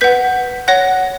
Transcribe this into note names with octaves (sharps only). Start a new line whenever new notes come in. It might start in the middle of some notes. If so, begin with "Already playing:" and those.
B4 F#5 G6 B6
C#5 F#5 F#6 A#6